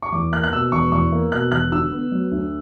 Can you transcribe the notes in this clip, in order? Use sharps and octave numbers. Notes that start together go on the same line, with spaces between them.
C#6
E2 D6
A#3 F#6
F#6
B2 E6
E1 C#6
E2 C#6
A#3
B2 F#6
E1 F#6
D3 E6
B3
F#3
D2